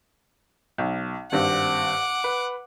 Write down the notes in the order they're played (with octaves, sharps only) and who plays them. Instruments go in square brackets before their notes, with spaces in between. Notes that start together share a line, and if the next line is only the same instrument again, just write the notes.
[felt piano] B1
[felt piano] G#1 G2 C4 [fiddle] F#5 D6
[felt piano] B4